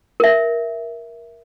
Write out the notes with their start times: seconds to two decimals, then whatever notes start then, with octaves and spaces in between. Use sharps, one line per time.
0.20 A#4 E5